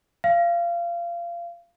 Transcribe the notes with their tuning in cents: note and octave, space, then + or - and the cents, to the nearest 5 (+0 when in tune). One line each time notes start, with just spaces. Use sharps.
F5 -25